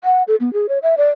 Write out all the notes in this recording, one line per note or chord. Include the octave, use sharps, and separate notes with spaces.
F#5
A4
B3
G#4
C#5
E5
D5